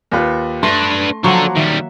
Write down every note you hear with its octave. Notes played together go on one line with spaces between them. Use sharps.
D#2 F4 B4
A3 D4 B4 C6 A#6
F3 F#3 A#3 D4 A4 F#5 C6 C#6
D#3 G3 E5